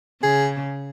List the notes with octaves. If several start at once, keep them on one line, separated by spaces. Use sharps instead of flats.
C#3 G#4